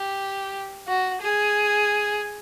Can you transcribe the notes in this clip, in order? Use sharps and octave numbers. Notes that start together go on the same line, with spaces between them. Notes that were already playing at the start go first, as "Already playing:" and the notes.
Already playing: G4
F#4
G#4